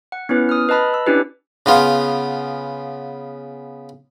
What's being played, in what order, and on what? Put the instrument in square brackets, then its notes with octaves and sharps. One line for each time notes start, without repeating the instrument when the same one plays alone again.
[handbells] F#5
B3 C#4 E4 B4
D#6 F6
B4 D#5 A5 B5
E6
C#4 D4 E4 G4 B4
[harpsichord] C#3 B3 F4